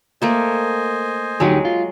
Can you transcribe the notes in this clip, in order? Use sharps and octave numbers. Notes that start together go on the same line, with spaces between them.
A3 A#3 A4 C5 D#5 G#5
D2 F#3 G#3 D#4 G4
F4